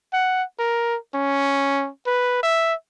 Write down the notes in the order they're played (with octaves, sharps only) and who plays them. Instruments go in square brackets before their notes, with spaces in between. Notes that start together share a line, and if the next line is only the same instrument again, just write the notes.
[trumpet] F#5
A#4
C#4
B4
E5